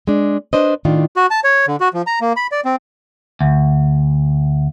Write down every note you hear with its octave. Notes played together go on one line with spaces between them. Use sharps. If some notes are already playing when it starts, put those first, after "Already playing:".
G#3 D4
D4 B4 C5 D5 D#5
A2 D#3 D4 F4
F#4
A5
C#5
D3
F#4
F3
A#5
A#3
B5
D5
C4
D2